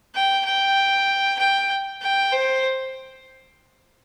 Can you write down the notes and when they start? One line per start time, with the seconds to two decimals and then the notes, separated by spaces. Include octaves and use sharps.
0.15 G5
0.45 G5
1.39 G5
2.02 G5
2.32 C5